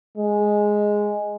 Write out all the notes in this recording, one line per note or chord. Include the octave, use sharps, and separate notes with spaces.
G#3